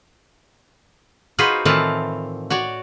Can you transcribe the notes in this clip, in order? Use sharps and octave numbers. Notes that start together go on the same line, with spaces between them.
D#4 F4 F#4 G#4 B4 C5
A2 D#3 E3 C4 F4 A5
F#4 C#5 D5